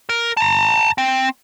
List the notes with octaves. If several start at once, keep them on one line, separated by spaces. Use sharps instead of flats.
A#4
A5 A#5
C4